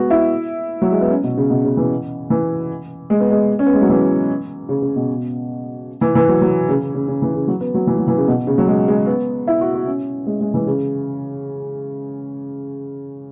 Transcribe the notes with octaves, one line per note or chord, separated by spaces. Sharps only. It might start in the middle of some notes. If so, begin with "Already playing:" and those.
Already playing: G#3 B3 F#4
E4
F#3
G#3
B3
C#4
B2
C#3
B2
C#3
E3
E3
G#3
B3
G#3
C#4
B3
G#3
F#3
E3
C#3
C#3
B2
E3
E3
F#3
F#3
C#3
C#3
C#3
E3
C#3
F#3
B3
F#3
E3
F#3
E3
C#3
B2
C#3
F#3
G#3
G#3
B3
E4
F#4
F#4
C#4
G#3
G#3
E3
C#3